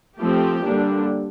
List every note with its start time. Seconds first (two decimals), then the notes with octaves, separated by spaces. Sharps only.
0.17 F3 A3 C4 G4
0.62 D3 G3 A#3 D4